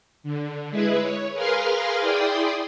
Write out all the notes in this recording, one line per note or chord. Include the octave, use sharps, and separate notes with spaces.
D3
G#3 E4 G#4 B4
C#5
G#4 A#4 B4 F5 C6 F6
E4 G#4 D5 G5 C6 D#6